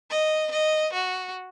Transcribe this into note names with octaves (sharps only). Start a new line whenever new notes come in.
D#5
D#5
F#4